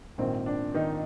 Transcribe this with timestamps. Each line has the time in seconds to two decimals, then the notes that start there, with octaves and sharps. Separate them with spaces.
0.18 A#1 G#2 D#3 A#3 C4
0.46 D4
0.74 D#3 D#4